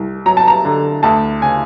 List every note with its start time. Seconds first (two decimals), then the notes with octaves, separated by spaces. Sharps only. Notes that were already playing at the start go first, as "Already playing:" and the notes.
Already playing: C2
0.26 F#3 A#5
0.37 A5
0.48 A#5
0.65 D3
1.03 D2 A5
1.42 C#3 G#5